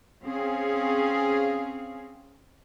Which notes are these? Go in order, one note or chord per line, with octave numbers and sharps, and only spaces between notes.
C4 C#4 G#4 F5